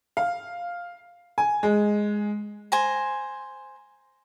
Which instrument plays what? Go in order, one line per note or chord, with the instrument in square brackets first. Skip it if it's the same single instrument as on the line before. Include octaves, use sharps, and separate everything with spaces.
[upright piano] F5
G#5
G#3
[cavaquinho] C5 G#5 A#5